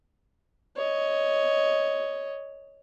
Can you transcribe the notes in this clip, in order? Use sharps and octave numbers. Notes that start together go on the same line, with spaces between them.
C#5 D#5